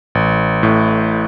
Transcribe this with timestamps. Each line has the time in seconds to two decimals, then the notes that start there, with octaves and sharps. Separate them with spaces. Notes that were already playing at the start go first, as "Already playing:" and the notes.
0.15 A1
0.63 A2